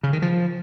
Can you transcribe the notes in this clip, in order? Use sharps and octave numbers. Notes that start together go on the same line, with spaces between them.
C#3
D#3
F3